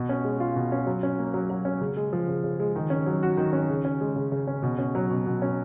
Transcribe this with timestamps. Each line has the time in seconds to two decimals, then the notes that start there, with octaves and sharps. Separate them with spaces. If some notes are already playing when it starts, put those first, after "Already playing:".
Already playing: B2
0.09 C#4
0.24 G#3
0.40 F4
0.56 B2
0.72 C#4
0.87 F#3
1.03 C#4
1.19 A#3
1.34 F#3
1.50 F#3
1.65 C#4
1.81 C#3
1.97 G#3
2.13 F3
2.28 C#3
2.44 C#3
2.59 G#3
2.76 D#3
2.90 C#4
3.06 F#3
3.23 F#4
3.37 D#3
3.53 C#4
3.70 C#3
3.85 C#4
4.01 G#3
4.16 C#3
4.32 C#3
4.47 C#4
4.63 B2
4.78 C#4
4.95 F#3
5.11 B2
5.26 B2
5.42 C#4